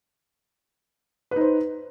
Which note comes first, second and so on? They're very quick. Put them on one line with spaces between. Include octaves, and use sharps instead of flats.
B4 D#4 C5